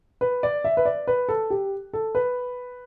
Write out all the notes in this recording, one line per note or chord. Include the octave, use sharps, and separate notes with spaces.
B4
D5
E5
B4
D5
B4
A4
G4
A4
B4